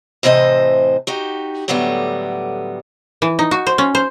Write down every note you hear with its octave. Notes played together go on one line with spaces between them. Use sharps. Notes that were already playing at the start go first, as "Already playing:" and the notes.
A2 C3 E3 C5 D#5
D#4 F#4 G4
A2 D3 F#3 G3 A3 B3
E3
D#4
F#4
C5
C#4
C5